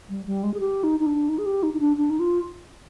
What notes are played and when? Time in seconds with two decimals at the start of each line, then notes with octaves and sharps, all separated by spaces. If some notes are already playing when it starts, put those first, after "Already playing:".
0.10 G3
0.26 G3
0.43 G#3
0.54 G#4
0.60 G4
0.84 D#4
1.00 D#4
1.06 D4
1.29 D#4
1.38 G#4
1.46 G4
1.63 D#4
1.74 D#4
1.80 D4
1.97 D4
2.10 D#4
2.19 F4